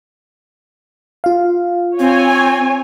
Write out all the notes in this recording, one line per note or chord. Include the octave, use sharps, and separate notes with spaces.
F4 F5
C4 C#5 G#5